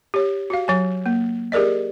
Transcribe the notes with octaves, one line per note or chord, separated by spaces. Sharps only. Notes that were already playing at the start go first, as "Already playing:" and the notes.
G4 C#5
F#4 F5
F#3 G#5
A#3
G4 G#4 A#4 D5 D#5